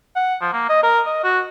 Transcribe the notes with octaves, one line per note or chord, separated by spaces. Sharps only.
F#5
F3
A#3
D#5
A#4
D#5
F#4